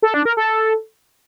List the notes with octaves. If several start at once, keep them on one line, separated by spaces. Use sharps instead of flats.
A4
D4
A#4
A4